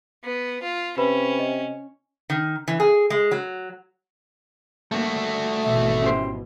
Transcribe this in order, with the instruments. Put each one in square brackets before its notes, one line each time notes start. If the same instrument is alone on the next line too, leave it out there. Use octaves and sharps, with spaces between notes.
[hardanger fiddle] B3
F4
[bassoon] C3 [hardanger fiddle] C#4 [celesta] B4 B5
[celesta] D#5
[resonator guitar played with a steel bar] D#3
E3
G#4
G#3
F#3
[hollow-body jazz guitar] G2 A#3 [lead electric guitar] A3 F#4
[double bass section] G#1 B2 E3 [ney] E5
[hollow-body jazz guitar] C#4 G4 C5